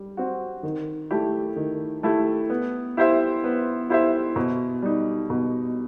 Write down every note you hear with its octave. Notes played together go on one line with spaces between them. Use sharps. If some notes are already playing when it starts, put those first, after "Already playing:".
Already playing: G3
C4 F#4
D#3
A3 E4 G4
D#3
A3 E4 G4
B3
E4 G4 C5 E5
B3
E4 G4 C5 E5
B2
G3 D#4
B2